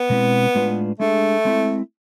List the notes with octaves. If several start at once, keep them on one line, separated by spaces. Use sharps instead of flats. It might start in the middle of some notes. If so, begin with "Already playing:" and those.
Already playing: B3
B2 G#3 C4 E4
A2 G#3 D4 F4 B4
G#3 A3 D4 G#4
G#3 C4 E4